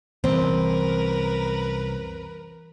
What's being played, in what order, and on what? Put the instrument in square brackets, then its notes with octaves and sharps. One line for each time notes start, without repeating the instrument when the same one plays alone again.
[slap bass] C2 F#2 [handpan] E3 [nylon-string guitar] C4 [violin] A#4 B4